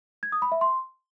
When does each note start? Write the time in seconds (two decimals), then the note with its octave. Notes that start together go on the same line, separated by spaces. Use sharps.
0.23 G#6
0.32 D#6
0.42 B5
0.52 E5
0.61 C6